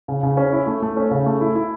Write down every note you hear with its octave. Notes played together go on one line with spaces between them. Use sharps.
C#3
C#3
C#4
E4
A3
A3
C#4
C#3
A3
E4
E4